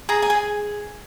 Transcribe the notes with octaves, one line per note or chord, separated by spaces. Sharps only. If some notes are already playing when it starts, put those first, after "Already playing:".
G#4 A#5
G#5
G#4